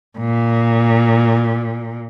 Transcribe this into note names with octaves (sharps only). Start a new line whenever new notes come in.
A#2